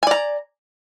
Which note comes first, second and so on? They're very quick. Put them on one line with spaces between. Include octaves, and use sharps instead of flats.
G#5 D5 A#5